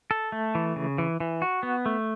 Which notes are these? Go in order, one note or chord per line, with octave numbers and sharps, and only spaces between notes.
A4
A3
E3
C#3
E3
E3
F#4
B3
A3